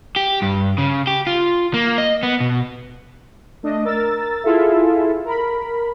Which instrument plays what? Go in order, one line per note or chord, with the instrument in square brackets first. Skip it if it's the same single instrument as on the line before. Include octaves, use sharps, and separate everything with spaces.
[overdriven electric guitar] G4
G2
C#3
G4
F4
A#3
D#5
B3
B2
[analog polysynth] A3 D4 D#5
A#4 E6 A6
E4 F4 G#4 A4 E5
A#4 B5